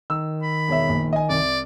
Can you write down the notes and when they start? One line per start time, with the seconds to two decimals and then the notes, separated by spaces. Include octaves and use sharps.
0.10 D#3 E6
0.43 B5
0.68 E1 C#5 E5
0.89 A#1
1.13 D#5 G#5
1.29 C2 D5